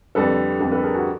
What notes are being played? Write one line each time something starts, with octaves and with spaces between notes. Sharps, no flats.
F2 D3 G3 A4 B4
F2 D3 G3
A4 B4
G#4 A#4
F#4 G#4